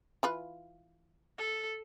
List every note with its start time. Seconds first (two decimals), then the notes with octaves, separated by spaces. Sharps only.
0.23 E3 F4 B4
1.38 A4